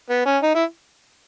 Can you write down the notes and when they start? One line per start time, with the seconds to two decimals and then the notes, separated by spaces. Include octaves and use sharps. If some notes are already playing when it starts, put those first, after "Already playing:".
0.09 B3
0.26 C#4
0.43 D#4
0.55 E4